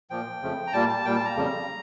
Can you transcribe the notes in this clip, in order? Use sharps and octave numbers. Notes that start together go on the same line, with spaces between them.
A#2 F3 A#3 G5
F2 C#3 F3 A3
A#5
A#2 G3 A#3 A5
A5
A#2 G3 A#3 G5
A5
A#5
F2 C#3 G3 A#3